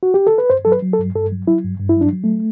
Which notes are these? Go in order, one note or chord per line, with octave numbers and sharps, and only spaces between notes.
F#4
G4
A4
B4
G2 C5
F#3 A4
B4
F#3
A4
G2
G2 A4
F#3
F#3 E4
G2
G2
E4
F#3 D4
F#3
A3